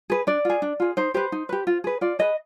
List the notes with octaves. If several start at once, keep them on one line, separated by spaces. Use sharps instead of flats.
G#4 B4
D4 D5
F4 G#4
D4
F4 G#4
D#4 C5
G4 B4 C5
D#4
G4 B4
F4
G#4 B4
F4 D5
G#4 B4 D#5